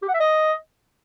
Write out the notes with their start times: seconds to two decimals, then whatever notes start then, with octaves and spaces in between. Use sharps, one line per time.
0.02 G4
0.08 F#5
0.14 E5
0.20 D#5